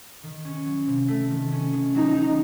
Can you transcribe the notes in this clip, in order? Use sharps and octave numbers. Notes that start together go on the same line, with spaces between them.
D#3
C#4
F#3
C3
A3
D#3
C#4
D#3
F#3 D#4
D#3